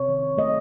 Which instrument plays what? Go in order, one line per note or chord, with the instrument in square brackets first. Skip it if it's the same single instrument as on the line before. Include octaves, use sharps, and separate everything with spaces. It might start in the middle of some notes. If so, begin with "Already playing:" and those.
Already playing: [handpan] C3 C#5
D#3
D#3
A3 D#5